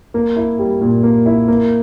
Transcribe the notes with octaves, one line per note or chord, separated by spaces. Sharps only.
A#3
E4
G3
A#2
A#3
E4
A#3